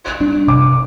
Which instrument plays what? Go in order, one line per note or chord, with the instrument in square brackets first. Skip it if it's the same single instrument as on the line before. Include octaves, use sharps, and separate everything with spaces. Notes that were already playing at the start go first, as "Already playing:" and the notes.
[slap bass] G3 D4
[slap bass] C3 [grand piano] D6